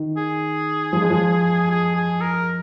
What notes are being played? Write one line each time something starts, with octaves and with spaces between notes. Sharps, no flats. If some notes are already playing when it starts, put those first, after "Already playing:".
Already playing: D#3
G#4
F3
G#3
F3
G#4
G#4
A#4